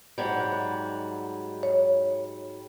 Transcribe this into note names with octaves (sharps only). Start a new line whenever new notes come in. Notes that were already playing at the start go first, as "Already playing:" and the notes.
G#2 F#3 G3
C#5